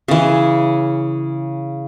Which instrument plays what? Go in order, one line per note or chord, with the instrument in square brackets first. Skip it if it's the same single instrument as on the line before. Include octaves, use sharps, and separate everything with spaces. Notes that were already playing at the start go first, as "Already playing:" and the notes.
[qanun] C#3 E3